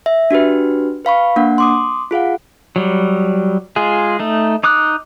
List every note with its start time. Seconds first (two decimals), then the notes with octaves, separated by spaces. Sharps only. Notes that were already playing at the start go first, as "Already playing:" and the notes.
0.06 E5
0.31 D4 F#4 G4 B4
1.05 B4 F5 B5 C#6
1.36 A#3 D4 F#5
1.58 C6 D6 D#6
2.11 F4 G#4 F5 F#5
2.76 F#3 G3
3.76 G#3 F4 G#4
4.19 A3 D#4
4.63 D#4 D6 D#6 F#6